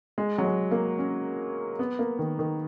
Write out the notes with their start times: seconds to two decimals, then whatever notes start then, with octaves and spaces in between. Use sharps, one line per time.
0.18 G#3
0.38 F#3
0.44 G#3
0.71 A#3
0.98 C#4
1.79 B3
1.99 A#3
2.19 D#3
2.39 D#3